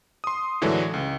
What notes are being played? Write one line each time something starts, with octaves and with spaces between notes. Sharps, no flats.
C6 D#6
A2 D3 E3 F#3 G#3 D4
C#2